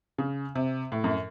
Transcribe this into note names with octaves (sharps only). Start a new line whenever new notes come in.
C#3
C3
A2
F#2